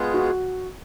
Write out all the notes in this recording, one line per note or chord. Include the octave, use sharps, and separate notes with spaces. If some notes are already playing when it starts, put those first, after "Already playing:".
Already playing: G#3 B3 F4 G#4
F#4